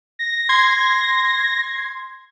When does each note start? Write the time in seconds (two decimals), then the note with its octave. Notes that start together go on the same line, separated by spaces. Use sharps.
0.19 A#6
0.49 C6 G#6